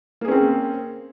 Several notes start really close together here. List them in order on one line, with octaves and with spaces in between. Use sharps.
A#3 G#4 C#4 C4